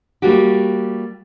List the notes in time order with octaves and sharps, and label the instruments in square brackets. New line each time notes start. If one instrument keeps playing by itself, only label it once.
[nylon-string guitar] G3 A3 A#3 F#4 G4